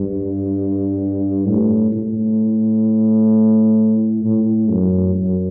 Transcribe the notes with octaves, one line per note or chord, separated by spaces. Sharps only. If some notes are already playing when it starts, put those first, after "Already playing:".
Already playing: G2
A2
A2
A2
F#2
F#2